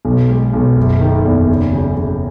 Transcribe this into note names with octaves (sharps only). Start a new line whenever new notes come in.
B1
G#3
B1
F#1
D#3
E2
C#3
C#3
C#3